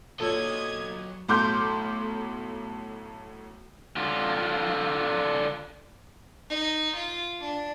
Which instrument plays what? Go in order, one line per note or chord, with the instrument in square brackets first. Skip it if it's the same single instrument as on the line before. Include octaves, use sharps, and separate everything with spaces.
[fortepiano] A#2 [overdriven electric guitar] F#3 D#5 [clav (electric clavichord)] A4 C#5 [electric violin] D#6 G#6
[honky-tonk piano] B1 A2 C6 D6 F6 G6
[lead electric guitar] D3 F4
[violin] D#4
F4
D4